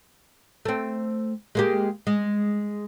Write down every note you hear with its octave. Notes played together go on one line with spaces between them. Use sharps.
A3 C4
G#3 A#3 G4
G#3